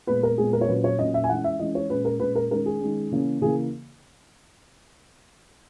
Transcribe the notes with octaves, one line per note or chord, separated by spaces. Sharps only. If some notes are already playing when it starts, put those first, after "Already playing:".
A#2 G#3 B3 B4
A#4
A#2 G#3 B3 G#4
A#4
C#5
A#2 F#3 C#4 B4
C#5
A#2 F#3 C#4 D#5
E5
G#5
E3 G#3 C#4 F#5
E5
E3 G#3 C#4 D#5
C#5
A#2 G#3 C#4 B4
A#4
A#2 G#3 C#4 B4
A#4
D#3 G#3 C#4 A#4
G#4
D#3 G#3 C#4
C#3 E3 A#3 C#4
C#3 E3 A#3 G#4